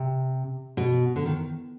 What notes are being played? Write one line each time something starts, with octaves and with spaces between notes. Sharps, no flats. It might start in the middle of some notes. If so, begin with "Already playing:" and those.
Already playing: C3
B2
D3
D#3